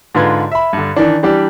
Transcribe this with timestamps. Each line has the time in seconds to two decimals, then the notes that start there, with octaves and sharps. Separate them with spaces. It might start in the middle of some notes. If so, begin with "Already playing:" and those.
0.15 G#2 D3 F4 B4 G#6
0.52 E5 B5
0.73 G2 D3
0.96 D#3 E3 D4
1.23 E3 G3 D4 G4